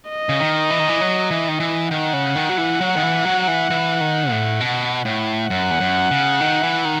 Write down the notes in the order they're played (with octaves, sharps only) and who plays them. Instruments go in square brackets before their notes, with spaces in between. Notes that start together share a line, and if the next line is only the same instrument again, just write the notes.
[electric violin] D#5
[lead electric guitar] C#3
D#3
E3
D#3
E3
F#3
E3
D#3
E3
[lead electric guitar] D#3 [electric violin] F#5
[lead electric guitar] C#3
D#3
F#3
E3
F#3
D#3
E3
F#3
E3
E3
D#3
A2
B2
A2
[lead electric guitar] F#2 [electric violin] F#5
[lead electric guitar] E2
F#2
C#3
D#3
E3
D#3